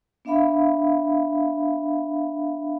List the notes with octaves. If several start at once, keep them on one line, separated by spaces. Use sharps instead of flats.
B3 D4 E5 F5 B5